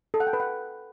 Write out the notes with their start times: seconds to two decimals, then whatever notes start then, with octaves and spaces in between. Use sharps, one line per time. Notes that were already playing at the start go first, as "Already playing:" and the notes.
0.14 A4
0.20 F#5
0.27 G5
0.33 B4
0.40 F#5